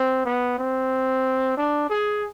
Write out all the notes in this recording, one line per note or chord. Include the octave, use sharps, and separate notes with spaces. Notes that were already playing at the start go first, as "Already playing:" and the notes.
Already playing: C4
B3
C4
D4
G#4